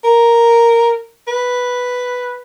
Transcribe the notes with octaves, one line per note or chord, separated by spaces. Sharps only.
A#4
B4